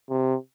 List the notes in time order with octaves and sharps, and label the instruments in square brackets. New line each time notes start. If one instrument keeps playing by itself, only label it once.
[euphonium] C3